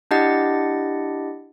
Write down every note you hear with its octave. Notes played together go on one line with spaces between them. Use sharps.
D4 E4 G4 D#5 F#5 A6